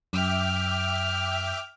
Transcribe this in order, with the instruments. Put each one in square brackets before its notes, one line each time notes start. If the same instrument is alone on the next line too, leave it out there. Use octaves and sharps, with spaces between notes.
[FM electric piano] F#2 [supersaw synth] E5 G5 D6 [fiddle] F6